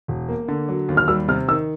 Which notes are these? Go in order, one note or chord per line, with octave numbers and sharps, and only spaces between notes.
E1
A#3
D3
F#3
D#2
F6
G3 E6
C3 F6
D#3 E6